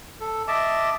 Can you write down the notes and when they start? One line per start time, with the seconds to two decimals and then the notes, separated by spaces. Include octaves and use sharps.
0.20 A4
0.48 D#5 E5 A5 D6